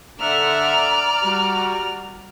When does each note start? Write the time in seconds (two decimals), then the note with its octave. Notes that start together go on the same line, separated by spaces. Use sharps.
0.20 D3 D5 E5 F#5 A#5 F6
1.21 G3 F#4